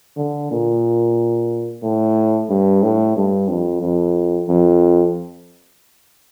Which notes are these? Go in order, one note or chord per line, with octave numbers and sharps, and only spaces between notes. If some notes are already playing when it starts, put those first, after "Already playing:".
D3
A#2
A2
G2
A2
G2
F2
F2
F2